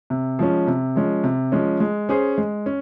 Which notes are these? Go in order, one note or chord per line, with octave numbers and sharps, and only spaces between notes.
C3
F3 G#3 C#4
C3
F3 G#3 C#4
C3
F3 G#3 C#4
G#3
C#4 G#4 C5
G#3
C#4